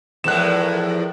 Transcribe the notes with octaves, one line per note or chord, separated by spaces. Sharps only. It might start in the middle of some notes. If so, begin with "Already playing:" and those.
E2 A2 F3 G#3 A4 A#4 F#6 E7